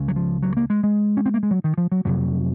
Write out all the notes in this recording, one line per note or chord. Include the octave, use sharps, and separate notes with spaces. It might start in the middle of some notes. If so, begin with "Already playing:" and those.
Already playing: C#2 C#3
F#3
F3
F#3
A#3
G#3
G#3
C#4
C4
A#3
G#3
F#3
D#3
F3
F#3
F2 C3 F#3